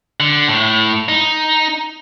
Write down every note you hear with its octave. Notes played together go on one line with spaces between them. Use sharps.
D3
A2
D#4